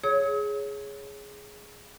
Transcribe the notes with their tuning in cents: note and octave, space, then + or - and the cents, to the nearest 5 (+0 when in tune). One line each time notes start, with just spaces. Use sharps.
G#4 +5 C#5 +0 D#6 +45